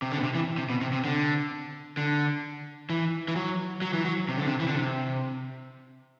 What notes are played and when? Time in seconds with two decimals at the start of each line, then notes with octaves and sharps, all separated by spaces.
0.02 C3
0.12 D3
0.18 B2
0.23 C3
0.35 E3
0.58 C3
0.70 B2
0.81 C3
0.93 C3
1.05 D3
1.97 D3
2.90 E3
3.28 E3
3.36 F#3
3.82 F#3
3.93 E3
4.05 F#3
4.29 C3
4.38 D3
4.46 C3
4.60 E3
4.67 D3
4.75 C3